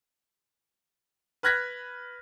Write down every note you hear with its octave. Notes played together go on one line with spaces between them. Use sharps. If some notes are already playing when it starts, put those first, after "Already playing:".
B4 F6 F#6 G#6 A#6 B6